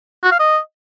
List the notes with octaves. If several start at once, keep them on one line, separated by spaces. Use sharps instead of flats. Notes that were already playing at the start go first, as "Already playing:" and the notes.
F#4
F5
D#5